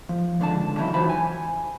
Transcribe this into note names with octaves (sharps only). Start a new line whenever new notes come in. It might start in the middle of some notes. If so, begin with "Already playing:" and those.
F3
C#2 D3 D4 A5
C#3 E3 F#3 D#4 E4
E3 F4 F#4 C5 A5 B5
G#5